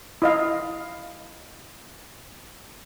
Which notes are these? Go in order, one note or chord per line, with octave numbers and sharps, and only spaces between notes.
E4 D#5 F5